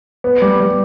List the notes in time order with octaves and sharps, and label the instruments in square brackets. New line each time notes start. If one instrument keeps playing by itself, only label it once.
[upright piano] B3
G3
G3